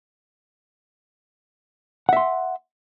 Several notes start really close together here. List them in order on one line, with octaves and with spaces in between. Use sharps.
F#5 E5 C6